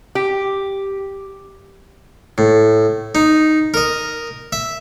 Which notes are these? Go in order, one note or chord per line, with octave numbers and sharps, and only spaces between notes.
G4
A2
D#4
A#4 D#5
E5